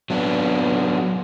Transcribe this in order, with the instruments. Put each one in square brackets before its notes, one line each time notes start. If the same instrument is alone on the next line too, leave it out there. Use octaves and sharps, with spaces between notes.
[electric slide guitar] F#3 B3 D4